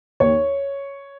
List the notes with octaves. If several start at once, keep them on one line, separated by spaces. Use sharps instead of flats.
D#2 C#5